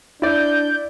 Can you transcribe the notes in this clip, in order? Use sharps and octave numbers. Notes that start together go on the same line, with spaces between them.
D4 E4 D5 G6